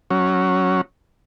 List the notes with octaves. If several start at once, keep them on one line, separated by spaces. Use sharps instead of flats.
F#3 C#4